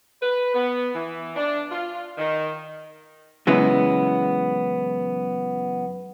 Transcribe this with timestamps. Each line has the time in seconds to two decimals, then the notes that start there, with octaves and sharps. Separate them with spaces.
0.21 B4
0.54 B3
0.94 E3
1.36 D4
1.70 F4
2.17 D#3
3.47 F#2 C#3 E3 G#3 B3